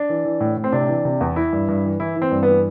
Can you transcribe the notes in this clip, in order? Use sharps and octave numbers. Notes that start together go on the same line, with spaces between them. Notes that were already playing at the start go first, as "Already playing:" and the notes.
Already playing: D4
E3
E3
A2
A2
C4
C3 D4
E3
C3
E2
E3 E4
G2
G2
E3
E3 E4
E3
C4
G2
B3
E3